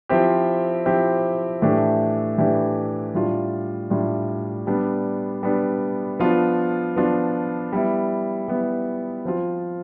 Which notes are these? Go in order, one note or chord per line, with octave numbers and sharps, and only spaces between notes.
F3 C4 E4 G4
F3 C4 E4 G4
A2 E3 A3 D4 G4
A2 E3 A3 D4 G4
A2 G3 D4 F4
A2 G3 D4 F4
G3 B3 D4
G3 B3 D4
F3 B3 D4 F4
F3 B3 D4 F4
G3 B3 E4
G3 B3 E4
F3 C4 F4